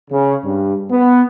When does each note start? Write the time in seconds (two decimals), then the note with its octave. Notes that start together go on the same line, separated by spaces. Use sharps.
0.10 C#3
0.44 G2
0.89 B3